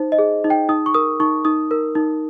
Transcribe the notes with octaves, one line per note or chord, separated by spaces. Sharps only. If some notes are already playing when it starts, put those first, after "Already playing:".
Already playing: D#4 C5
D#5
G#4
D#4
G5
D#4 D#6
C#6
A#4 D#6
D#4 C#6
D#4 D#6
A#4
D#4